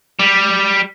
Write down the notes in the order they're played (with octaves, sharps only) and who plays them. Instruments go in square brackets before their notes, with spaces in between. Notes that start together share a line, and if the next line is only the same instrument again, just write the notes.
[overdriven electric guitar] G3